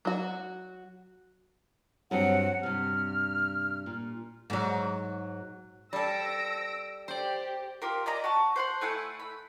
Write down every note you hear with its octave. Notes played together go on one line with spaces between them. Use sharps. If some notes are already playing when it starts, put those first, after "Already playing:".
F#3 F#4
G2 F#3 C4 F#5
G2 C3 F6
A#2
G#2 F#3
G3 A4 E6 A#6 D7
G4 C5 D5
F4 G4 A#4
D5 D#5 G#5 A#5
F#4 A5
C5 F#5 C6
A3 E4 F#5 G#5
B5